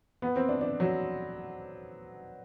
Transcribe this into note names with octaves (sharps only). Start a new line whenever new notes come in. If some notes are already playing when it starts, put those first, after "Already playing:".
B3
C4
D4
D4
F#3